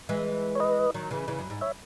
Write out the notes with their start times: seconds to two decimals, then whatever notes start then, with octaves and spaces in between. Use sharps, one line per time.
0.09 E3 G#3
0.55 C#5
0.60 B4 D#5
0.94 D#3 F#3
1.11 C#3 E3
1.28 C#3 E3
1.39 F#2
1.50 G#2
1.61 C#5 E5